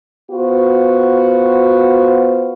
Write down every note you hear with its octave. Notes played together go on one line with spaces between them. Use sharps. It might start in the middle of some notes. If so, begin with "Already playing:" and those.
B3 F4 F#4 C5